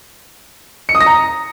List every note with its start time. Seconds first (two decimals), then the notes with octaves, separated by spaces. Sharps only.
0.89 C#7
0.95 D#6
1.01 A#6
1.06 A#5